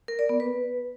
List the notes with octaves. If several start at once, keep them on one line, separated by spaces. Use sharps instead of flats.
A#4
D5
B3
B4